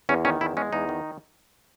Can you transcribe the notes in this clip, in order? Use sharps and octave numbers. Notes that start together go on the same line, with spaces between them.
E2 C#4
D#3 C#4
E2 E4
G#3 C#4
E2 D#4
D#3